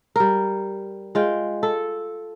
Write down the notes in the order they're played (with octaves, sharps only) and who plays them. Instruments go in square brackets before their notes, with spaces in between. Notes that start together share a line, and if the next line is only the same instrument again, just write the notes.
[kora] G3 A#4
G#3 F4 G5
A4